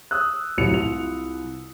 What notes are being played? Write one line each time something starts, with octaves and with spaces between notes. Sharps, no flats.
D#6 E6 F#6
D1 C2 F#3 C#7 F7
C2 F4 F7